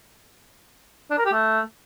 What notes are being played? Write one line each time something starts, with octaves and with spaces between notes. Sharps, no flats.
D4
A#4
G4
A3